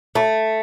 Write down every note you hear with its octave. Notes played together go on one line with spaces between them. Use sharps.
A3